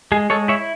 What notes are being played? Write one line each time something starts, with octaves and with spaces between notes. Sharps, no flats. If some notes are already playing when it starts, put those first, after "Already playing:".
G#3 G#4
G#3 A4 C#5
E4 C#5 E5